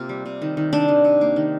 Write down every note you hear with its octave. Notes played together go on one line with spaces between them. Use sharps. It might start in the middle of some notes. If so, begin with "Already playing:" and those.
Already playing: C3 A#3 F4
G3
C3
D#3
D#3
C3 D4
D#3
C3
A#3
D#3